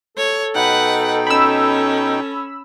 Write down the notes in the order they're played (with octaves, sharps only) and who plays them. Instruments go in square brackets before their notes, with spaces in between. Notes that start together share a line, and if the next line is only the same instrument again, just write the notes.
[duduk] A4 [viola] C#5
[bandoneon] B2 D#4 G5 [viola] B4 F#5
[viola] C#4 [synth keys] B5 E6